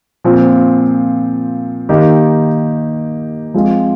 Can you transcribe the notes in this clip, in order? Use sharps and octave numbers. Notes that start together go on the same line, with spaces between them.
A#2 F3 C4
D#3 A#3 D#4 G4
F3 G#3 C4 F4